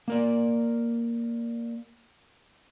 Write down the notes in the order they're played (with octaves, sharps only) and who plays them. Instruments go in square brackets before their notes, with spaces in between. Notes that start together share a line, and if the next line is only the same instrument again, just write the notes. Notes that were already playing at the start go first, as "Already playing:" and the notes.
[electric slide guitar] A#3 A#4 D5